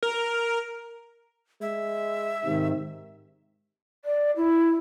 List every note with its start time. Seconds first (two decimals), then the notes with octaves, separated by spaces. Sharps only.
0.03 A#4
1.62 G#3 E5
2.45 G#2 C3 D#3
4.05 D5
4.37 E4